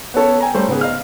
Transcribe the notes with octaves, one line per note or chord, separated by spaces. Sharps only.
B3 C#4 A4 C#5
G5 G#5 A#5
G3 A3 C#4 C5
G#1 C#3 B3 G#4
D#5 F5 F6